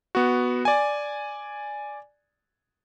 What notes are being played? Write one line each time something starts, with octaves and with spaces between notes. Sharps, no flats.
B3 F#4
D5 G#5